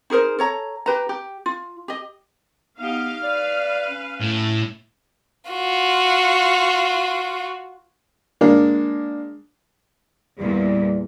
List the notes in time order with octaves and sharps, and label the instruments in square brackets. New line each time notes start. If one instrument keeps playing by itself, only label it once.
[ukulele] D#4 G#4 A#4 C5
A4 C#5 A#5
G4 B4 A#5
G4
F4
G4 D#5
[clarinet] B3 [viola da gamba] D#4 G4 [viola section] F5
[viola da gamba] B4 [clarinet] D5
[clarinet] C#4
[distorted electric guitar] A2
[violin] F4 F#4
[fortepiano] G#3 A#3 D4
[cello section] E2 A#2 [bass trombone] G3